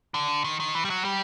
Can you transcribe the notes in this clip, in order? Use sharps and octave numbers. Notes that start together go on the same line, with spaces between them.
D3
D#3
D#3
E3
G3
F#3
G3